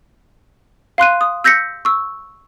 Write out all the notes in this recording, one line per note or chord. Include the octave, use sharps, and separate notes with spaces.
F5 C6 F#6 D#7
D#6
E6 G6 A#6 B6 C#7
C#6 E6